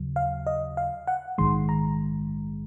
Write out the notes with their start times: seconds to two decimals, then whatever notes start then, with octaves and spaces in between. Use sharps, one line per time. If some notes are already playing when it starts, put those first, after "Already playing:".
Already playing: D#2 C#3 F#3
0.16 F5
0.47 D#5
0.77 F5
1.07 F#5
1.38 A#1 G#2 D#3 G#3 C6
1.69 A#5